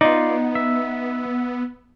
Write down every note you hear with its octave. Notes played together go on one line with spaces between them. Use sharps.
B3 D#4 F4 D5
E5